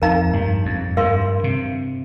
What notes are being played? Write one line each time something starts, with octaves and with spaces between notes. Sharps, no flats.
F2 D#4 A#4 F5 A#5
G2
F2
G2 A#4 F5 C6
C3